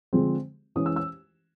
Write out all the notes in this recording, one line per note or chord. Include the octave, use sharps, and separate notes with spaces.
D3 F3 G#3 C4
E3 G#3 C#4 D#6
E6
E6